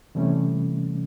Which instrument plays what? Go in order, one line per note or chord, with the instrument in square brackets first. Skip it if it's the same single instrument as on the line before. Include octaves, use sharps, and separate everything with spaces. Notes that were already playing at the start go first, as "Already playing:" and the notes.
[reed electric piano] C3 E3 G3 A3 C#4